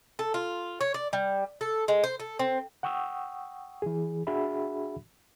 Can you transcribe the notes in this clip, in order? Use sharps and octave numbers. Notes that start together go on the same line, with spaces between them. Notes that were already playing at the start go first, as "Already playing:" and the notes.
A4
F4
C#5
D5
G3
A4
G#3
C5
A4
C4
F#5 G5 C#6 D#6 E6
E3 G#4
D4 F#4 G#4 E5 F#5 B5